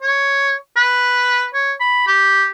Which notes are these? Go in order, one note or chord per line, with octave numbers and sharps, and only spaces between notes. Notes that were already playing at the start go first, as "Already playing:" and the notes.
C#5
B4
C#5
B5
G4